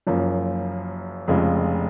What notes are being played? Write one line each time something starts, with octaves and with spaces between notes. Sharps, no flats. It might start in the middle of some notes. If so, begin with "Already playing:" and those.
F#1 F#2 F3 A#3
F1 F2 C#3 F3 G#3